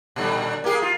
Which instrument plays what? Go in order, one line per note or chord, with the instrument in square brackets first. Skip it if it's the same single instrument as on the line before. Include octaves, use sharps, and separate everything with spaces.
[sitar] A#2 D3 G3
A#3 G4 G#4
F4